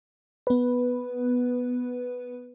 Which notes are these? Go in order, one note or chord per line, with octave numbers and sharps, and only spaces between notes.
B3 B4